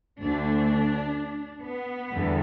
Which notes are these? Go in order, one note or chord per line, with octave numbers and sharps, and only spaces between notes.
D2 D3 A3 D4
B3
E2 D3 G3